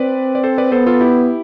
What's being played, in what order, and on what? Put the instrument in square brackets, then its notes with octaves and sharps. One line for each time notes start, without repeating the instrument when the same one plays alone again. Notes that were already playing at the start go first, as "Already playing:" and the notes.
Already playing: [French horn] C4 [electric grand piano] B4 D5
[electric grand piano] D5
A4 C5
B4 D5
[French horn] B3 [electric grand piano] A4 C5
[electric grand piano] F4 A4
E4 G4